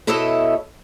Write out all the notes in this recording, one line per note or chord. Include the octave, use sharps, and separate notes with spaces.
B2 E4 A4 C#5 D#5 E5